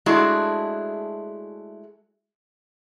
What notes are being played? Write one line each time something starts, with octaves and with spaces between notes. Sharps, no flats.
G#3 A3 D4 E4 F#4 G#4